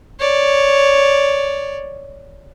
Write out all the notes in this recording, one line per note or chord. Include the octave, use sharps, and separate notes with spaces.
C#5 D5